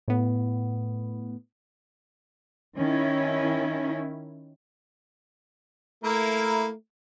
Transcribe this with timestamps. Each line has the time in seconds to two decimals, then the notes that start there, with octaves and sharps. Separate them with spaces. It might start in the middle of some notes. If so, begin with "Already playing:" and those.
0.08 A2 B3
2.76 D#3 C#4 E4
6.04 A3 A#3 E4 A#4